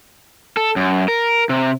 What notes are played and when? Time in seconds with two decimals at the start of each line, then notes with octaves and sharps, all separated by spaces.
0.57 A4
0.76 F#2
1.08 A#4
1.49 C3